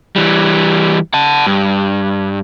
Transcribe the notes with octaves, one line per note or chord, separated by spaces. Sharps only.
E3 G3
F#5 A5
G2